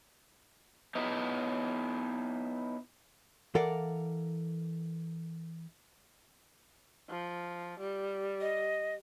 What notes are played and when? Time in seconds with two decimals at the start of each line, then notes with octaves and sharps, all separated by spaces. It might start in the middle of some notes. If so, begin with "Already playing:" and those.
0.95 B3 D#4 E4
3.55 E3 A4 A#4 D5 F5 F#5
7.09 F3
7.80 G3
8.41 D#5